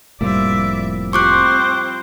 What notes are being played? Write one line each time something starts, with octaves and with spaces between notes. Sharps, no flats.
F1 A2 F3 G3 A#3 E4 D5 E5
C4 F4 G4 C5 B5 C#6 D6 F#6